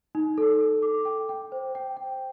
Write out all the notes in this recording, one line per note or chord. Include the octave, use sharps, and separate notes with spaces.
D#4
A4
A4
D6
G5
G5
C5
G5
G5